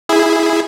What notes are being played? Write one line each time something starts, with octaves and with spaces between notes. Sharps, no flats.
E4 G#4